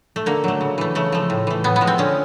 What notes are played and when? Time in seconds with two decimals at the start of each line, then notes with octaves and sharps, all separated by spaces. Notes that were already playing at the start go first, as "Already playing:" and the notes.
0.16 A3
0.26 D3 A#3
0.44 F#3 A3
0.61 C#3
0.78 E3 A3
0.95 C#3 A3
1.12 F3 A3
1.30 A2
1.47 E3 A3
1.64 A2 B3
1.76 B3
1.81 F3 G#3
1.87 C4
1.98 D3 C#4